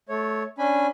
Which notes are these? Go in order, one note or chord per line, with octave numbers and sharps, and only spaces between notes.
A3 C#5
C#4 D4 G#5 B5